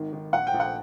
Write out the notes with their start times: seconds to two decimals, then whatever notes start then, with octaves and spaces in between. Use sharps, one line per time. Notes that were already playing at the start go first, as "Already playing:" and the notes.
Already playing: G#1 D#3
0.13 D#3
0.33 A#1 F#5
0.47 G5
0.54 A#1
0.60 F#5